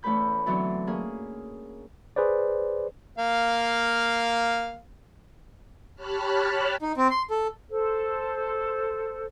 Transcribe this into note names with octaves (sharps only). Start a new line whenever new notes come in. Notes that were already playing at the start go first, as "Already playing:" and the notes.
E2 A3 C#4 B4 B5 G6
D3 E3 F#3 B3 C4 D4
A#3 C#4 G#4
G#4 B4 C5 D5
A#3 F5
G4 C#5 A5 B5 F6 F#6
D#4
C4
C6
A4
A4 C5